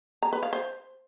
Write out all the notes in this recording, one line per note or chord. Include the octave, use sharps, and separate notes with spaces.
A#5
B4
F5
C5